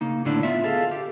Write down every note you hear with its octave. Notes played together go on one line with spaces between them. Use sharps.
C#3 A#3 D#4
A2 D3 D4 E4 D5
B3 F4 E5
G#4 A4 D#5 F5
G4 B4